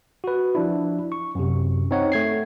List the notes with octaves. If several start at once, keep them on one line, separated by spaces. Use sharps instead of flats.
F#4 B4
F3 D4 E4
C#6
F#2 C3
C4 D#4 C#5 F#5
A3 G#6 C7